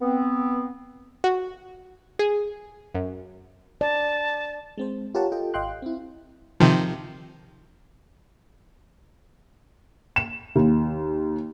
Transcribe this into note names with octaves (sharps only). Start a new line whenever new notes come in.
B3 C4
F#4
G#4
F#2
D5 A5
G#3 C4 C5
F4 G4 A#4 C#5 F#5 A5
F4 G4 A4 D#5 G5
G#1 D#5 F5 G5 C6 F#6
C4 E4
C3 D#3 F3
E7
D#2